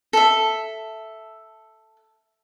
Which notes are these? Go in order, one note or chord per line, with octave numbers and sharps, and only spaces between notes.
A4 E5